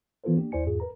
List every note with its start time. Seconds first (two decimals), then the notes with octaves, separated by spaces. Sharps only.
0.24 E3 B3 F4 A4 A#4 C5
0.36 A#3 D4 G4
0.52 D#2 E4 C5 D5 G#5 C#7
0.66 E2 G#2 F4 G#4
0.80 A#4 B4 A#5